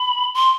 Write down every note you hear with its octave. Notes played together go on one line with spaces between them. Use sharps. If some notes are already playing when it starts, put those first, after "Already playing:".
Already playing: B5
C6